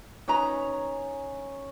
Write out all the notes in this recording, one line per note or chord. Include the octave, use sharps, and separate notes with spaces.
C#4 D#4 B4 A#5